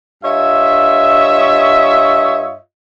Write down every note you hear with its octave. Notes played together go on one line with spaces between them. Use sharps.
G2 F4 C#5 D#5 E5